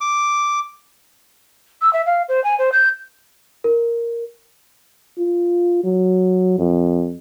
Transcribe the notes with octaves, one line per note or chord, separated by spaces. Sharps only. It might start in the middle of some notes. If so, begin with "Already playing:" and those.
D6
E6
E5
F5
C5
G#5
C5
G6
A#4
F4
F#3
F2